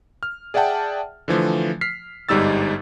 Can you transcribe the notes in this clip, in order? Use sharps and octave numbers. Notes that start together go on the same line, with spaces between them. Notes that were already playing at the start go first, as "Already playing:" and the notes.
F6
G#4 D5 E5 F#5 G5 A5
D3 E3 F3 A3
F6 B6 C7
G1 G#2 G3 D#4 E6 A6